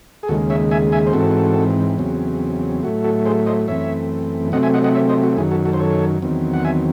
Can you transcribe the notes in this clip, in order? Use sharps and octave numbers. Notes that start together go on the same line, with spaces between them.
G#4
D#2 C#3 G#3 F#4 A4
C#5 E5
E5 G#5
E5 G#5
C5
G#2 E3 C4 F#4 A4
E2 C#3 F#3 C4
A2 F#3 A3 F#4
F#4 A4
G#4 C5
C5 D#5
F#2 E3 A3 C4 C#5 E5
C3 F#3 A3 C4 D#5 F#5
E5 G#5
D#5 F#5
D#5 F#5
C#5 E5
C5 D#5
F#4
F#2 D#3 F#3 E4 G#4
F#4 A4
F#4 A4
C5
A4 C#5
E2 D#3 F#3 C4
F#5
E5 G#5